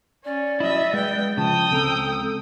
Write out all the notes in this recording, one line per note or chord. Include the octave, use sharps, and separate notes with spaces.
C#4 D5
F#3 E4 D#5 E5
G#3 B3 G5
C#3 F3 G5 A5 D#6
C#2 C4 A4 A#5